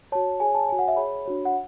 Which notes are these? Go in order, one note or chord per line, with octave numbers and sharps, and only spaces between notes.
F#4 C#5 A5
G#4 C#5 G#5
A5
F#4 C#5 G#5
F#5
E5
G#4 C#5 B5
D4 F#4 C#5
F#5